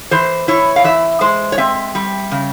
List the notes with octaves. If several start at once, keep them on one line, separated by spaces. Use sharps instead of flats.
E3 C5
E4 C#5
F5
E3 E5
G#3 C5
C#5
C4 E5
G3
C#3